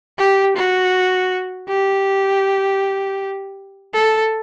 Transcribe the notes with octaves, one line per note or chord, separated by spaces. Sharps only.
G4
F#4
G4
A4